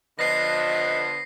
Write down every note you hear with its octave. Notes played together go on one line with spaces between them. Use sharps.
D3 F3 B3 D#5 A#6 C7